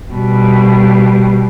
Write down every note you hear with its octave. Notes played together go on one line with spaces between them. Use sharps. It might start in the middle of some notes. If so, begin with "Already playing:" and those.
B2 G3